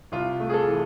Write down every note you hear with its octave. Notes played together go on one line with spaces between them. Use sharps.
C2 F4
A3
G#4
A4
E3